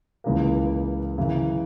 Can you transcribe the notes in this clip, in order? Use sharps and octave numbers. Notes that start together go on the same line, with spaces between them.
C#2 C#3 E3 A#3
F#2 C#3 E3